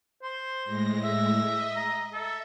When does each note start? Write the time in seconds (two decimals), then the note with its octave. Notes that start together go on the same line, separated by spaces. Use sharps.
0.23 C5
0.65 A2 G#3 A#6
1.04 E5
1.43 D#5
1.76 A#5
2.13 A4 E5